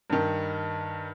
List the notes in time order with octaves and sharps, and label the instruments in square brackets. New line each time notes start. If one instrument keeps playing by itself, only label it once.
[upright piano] G2 D#3